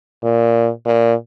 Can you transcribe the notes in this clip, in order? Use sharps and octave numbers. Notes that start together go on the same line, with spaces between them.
A#2
A#2